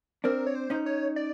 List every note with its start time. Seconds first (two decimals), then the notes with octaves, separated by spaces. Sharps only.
0.24 C4 D4 A#4
0.47 C#5
0.55 C5
0.70 C#4 D#4
0.86 C#5
1.16 D5